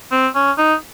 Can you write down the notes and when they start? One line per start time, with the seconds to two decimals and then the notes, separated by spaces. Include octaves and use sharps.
0.12 C4
0.35 C#4
0.58 D#4